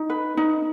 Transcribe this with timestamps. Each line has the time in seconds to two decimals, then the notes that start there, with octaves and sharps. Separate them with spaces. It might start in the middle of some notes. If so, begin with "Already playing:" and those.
Already playing: D#4
0.10 B4
0.37 D#4